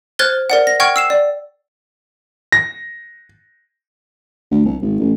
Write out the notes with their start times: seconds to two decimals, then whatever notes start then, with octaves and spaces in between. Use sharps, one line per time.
0.19 C5 F6 F#6 G#6 A6 G7
0.50 A#4 D5 F#5
0.67 A#6
0.80 F#5 G5 C#6 F6 G#6
0.96 E6 C7 E7
1.10 D5
2.52 A#6
4.51 D2
4.65 C2
4.81 G#1
4.99 A1